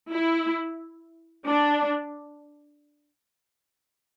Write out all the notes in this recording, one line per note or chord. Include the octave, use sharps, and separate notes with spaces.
E4
D4